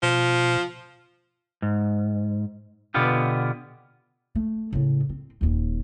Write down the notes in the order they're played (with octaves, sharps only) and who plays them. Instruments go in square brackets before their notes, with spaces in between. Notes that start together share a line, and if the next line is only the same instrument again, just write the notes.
[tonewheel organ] B2 [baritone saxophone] F3
[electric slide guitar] G#2
B2 D3 B3 F4 G4
[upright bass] A3
A2 C#3
C4
D#1 D#2